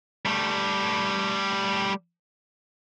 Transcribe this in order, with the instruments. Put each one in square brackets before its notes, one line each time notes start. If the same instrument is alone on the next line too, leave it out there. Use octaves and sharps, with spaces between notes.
[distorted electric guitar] G3 A3